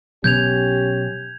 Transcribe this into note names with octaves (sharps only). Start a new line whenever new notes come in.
B2 F#3 B3 C#4 G4 G6 G#6 F7